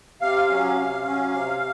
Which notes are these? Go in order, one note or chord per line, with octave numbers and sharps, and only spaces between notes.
C3 F5
F#3 C#4
C3
F#3 C#4
C3